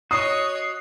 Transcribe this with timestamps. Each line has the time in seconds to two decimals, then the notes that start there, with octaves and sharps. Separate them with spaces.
0.11 F#4 C#5 D#5 D#6 C7